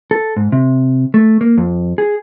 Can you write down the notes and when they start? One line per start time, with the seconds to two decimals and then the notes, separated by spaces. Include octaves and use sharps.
0.11 A4
0.36 G#2
0.52 C3
1.14 A3
1.41 A#3
1.57 F2
1.98 G#4